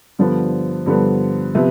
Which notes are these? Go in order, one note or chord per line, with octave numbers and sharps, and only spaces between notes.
G2 D3 F3 B3
G2 D3 F3 B3
C3 F3 B3 B4